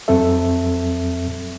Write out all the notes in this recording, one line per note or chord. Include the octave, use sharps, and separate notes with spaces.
F2 F#3 C4 A4 E5